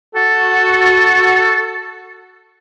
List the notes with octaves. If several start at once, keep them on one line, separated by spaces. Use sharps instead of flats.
F#4 A4